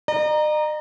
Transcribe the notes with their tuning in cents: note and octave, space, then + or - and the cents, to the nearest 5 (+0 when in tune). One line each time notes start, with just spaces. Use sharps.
D#5 -45 A#5 +0